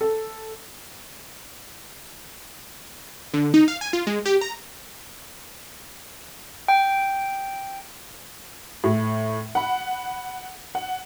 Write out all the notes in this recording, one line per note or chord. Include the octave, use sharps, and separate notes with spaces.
A4
D3
D#4
F5
G#5
F4
G#3
G4
A#5
G5
A2
F#5 B5
F#5